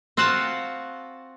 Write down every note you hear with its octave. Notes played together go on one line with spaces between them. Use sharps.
C4 F4 F#4 F#5 A5